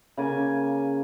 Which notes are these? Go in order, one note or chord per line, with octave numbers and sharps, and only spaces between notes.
C#3 A#3 G#5 D6